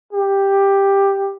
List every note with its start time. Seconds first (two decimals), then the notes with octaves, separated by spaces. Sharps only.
0.13 G4